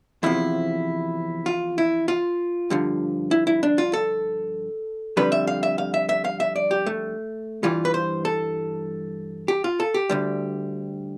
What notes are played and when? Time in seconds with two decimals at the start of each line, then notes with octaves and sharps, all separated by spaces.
0.23 E2 C3 F3 E4
1.46 F4
1.78 E4
2.08 F4
2.70 G2 D3 F3
3.31 E4
3.47 E4
3.63 D4
3.78 F4
3.93 A4
5.17 F2 D3 G3 B4
5.32 E5
5.47 F5
5.63 E5
5.78 F5
5.94 E5
6.09 E5
6.25 F5
6.40 E5
6.56 D5
6.71 G4
6.86 A3
7.63 G2 E3 G3 F4
7.85 B4
7.94 C5
8.25 A4
9.48 G4
9.64 F4
9.80 A4
9.94 G4
10.10 D2 D3 G3